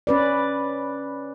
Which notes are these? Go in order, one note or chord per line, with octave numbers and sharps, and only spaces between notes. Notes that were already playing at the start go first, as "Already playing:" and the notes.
C#4 B4 D5